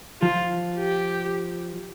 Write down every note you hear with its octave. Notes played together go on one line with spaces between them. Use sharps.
F3 F4
G4